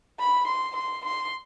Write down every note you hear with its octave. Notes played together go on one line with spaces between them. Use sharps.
B5
C6
C6
C6